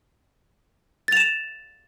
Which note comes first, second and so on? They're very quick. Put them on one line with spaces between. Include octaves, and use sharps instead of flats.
A6 F7 E7